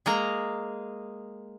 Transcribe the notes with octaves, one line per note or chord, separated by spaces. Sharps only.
G#3 A#3 A#5